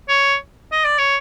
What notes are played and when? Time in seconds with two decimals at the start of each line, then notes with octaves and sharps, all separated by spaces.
0.08 C#5
0.71 D#5
0.84 D5
0.98 C#5